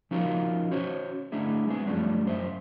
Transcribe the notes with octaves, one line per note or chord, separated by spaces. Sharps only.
F3 C#4 D#4 F4 F#4 A#4
C#4 F#4 C5 C#5
A3 D4 E4 G#4
G#3 B3 C4 G#4
F#2 F3 G3 A3 C#4 D4
F#2 C5 E5